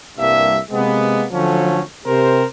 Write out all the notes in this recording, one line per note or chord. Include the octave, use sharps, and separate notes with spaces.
C2 G2 A#3 E5
C3 G#3 A#3 B3
D3 F3 F#3 A3 C#4
C3 G4 A#4 C5